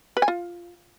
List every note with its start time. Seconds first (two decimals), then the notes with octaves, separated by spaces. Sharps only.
0.17 B4
0.22 G#5
0.28 F4